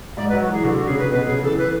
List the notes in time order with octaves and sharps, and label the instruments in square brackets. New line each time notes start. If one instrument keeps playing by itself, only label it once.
[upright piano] G#2 [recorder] D5
[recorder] B4
[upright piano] F#3
[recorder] F#4
[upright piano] E3 [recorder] G#4
[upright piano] D3 [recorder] F#4
[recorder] F#4
[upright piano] C#3 [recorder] G#4
[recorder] B4
[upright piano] B2 [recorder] B4
[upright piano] C#3 [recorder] G#4
[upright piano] E3 [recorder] A4
[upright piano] E3 [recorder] B4